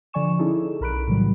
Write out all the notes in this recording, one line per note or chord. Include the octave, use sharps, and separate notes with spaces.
D3 F3 D5 G#5 C#6 E7
C#4 D#4 E4 G#4 A4
B1 A#4 B5 F#6 D7
A2 C#3 E3 F#3 G3